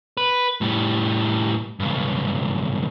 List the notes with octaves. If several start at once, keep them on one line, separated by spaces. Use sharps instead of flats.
B4
A2 G3
C#2 G2